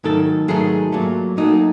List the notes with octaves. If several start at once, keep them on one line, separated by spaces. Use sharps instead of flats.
G#2 D#3 F#3 A3 A4
G#2 D#3 F#3 A3 G#4
A#2 F#3 A3
A#2 F#3 A3 D#4